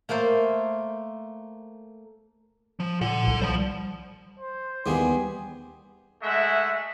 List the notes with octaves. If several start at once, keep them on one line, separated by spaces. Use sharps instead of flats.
A3 A#3 A4 C5
F3
A#2 A4 F#5
C2
F3 G3 C5
C5
D#2 E3 G3 B3 G4 G#4
G#3 A3 E5 F#5